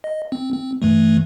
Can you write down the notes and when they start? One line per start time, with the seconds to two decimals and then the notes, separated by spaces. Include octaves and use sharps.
0.04 D#5
0.32 C4
0.54 C4
0.82 G2 E3 A3